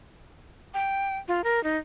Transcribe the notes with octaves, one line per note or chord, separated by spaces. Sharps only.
G5
F4
A#4
D#4